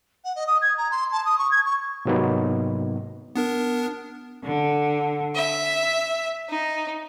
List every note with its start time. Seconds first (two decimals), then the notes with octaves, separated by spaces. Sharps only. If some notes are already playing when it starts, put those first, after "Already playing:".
0.24 F#5
0.36 D#5
0.47 D#6
0.62 G#6
0.77 A#5
0.91 C6
1.12 A5
1.25 D#6
1.38 C#6
1.51 G#6
1.66 C#6
2.05 G#2 C3 F#3 A#3 B3 D#4
3.36 B3 D4 A#4
4.43 D3
5.34 E5
6.49 D#4